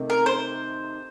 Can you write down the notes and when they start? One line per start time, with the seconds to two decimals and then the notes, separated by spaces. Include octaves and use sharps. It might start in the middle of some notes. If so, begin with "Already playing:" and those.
Already playing: C3 D#3 A3 D#4
0.10 A#4
0.26 C5